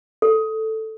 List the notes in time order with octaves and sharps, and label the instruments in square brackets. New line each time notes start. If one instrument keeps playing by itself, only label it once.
[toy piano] A4